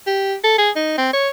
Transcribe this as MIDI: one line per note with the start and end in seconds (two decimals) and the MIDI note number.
0.07 0.35 67
0.44 0.56 69
0.58 0.70 68
0.76 0.95 63
0.98 1.13 60
1.13 1.29 73